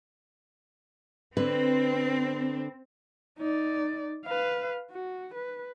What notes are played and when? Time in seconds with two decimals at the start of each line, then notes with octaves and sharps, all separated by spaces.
1.37 D3 C4 B4
3.39 D#4 D5
4.25 B4 F5
4.91 F#4
5.35 B4